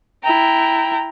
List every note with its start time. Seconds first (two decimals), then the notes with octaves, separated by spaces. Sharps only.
0.23 E4 G5 A#5